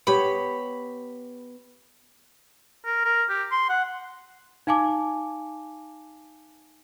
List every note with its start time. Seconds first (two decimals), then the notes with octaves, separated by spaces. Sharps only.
0.07 B3 G4 C#5 B5
2.85 A#4
3.05 A#4
3.29 G4
3.52 C6
3.69 F#5
4.67 D#4 F5 G#5 A5 D6